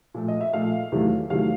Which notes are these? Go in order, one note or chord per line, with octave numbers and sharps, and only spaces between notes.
A#2 F3 A3
D#5
E5
A#2 F3 A3 F5
E2 C3 D#3 F#3 A3
E2 C3 D#3 F#3 A3 F5